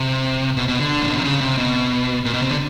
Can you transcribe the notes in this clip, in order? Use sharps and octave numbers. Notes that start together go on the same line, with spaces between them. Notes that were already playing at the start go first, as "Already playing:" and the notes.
Already playing: C3
B2
B2
D3
A#2
B2
C3
C#3
C3
B2
A#2
B2
C3
D3